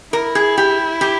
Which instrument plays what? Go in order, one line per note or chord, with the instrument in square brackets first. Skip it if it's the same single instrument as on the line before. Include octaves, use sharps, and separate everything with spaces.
[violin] E4 [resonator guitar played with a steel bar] A#4
[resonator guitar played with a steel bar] G#4
G4
G4